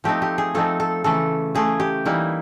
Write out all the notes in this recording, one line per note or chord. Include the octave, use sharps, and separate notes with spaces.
F3 A3 C4 D#4 G4
G4
G#4
F3 A3 C4 D#4 A4
A4
C#3 E3 A3 A4
C#3 E3 A3 G#4
G4
E3 G3 A#3 D#4 E4